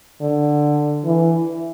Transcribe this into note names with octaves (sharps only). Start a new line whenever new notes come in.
D3
E3